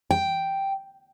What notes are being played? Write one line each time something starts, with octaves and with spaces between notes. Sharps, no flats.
G5